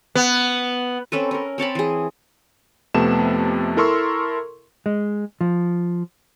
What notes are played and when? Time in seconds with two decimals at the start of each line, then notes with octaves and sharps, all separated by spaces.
0.15 B3
1.12 C4 C#4 A4 B4
1.31 C#4 A#4
1.58 C4 C#5 A5 B5
1.75 E3 G#4
2.94 F2 C3 A3 B3 A5 E7
3.77 E4 A4 A#4 C6 C#6 E6
4.86 G#3
5.41 F3